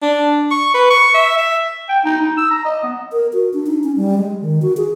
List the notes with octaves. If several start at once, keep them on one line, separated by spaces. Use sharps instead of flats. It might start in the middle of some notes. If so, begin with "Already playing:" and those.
D4
C#6
B4
C#6
E5
E5
G5
D#4
D#4
E6
A#5
D#5
B3
A#4
F#4
D4
D#4
C#4
G3
G#3
D#3
F#4
G#4